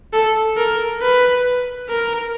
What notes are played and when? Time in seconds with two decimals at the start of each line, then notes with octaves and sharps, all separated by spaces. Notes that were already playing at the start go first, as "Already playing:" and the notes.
0.13 A4
0.57 A#4
1.01 B4
1.89 A#4